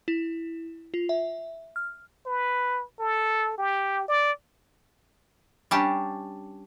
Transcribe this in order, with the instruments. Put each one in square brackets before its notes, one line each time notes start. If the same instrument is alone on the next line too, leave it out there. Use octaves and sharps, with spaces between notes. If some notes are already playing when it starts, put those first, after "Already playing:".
[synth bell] E4
F4
E5
F6
[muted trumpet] B4
A4
G4
D5
[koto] G3 C#4 D4 G4 A5